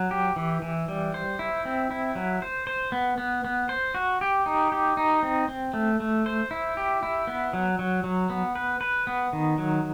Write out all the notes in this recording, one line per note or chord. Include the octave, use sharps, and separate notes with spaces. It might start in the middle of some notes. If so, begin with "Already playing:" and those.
Already playing: F#3
G4
E3
E3
G3
C5
E4
C4
E4
F#3
C5
C5
B3
B3
B3
C5
F#4
G4
D#4
G4
D#4
C4
C4
A3
A3
C5
E4
G4
E4
B3
F#3
F#3
F#3
B3
B4
B4
B3
D#3
F#3